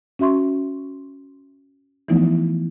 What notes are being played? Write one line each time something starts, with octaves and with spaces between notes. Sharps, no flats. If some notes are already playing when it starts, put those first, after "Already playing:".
C#4 F#4 E5 C6 C#6
E3 F3 A3 B3 D#4 E4